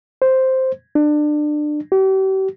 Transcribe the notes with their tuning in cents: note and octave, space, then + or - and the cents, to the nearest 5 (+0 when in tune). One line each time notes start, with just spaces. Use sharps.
C5 +0
D4 +25
G4 -40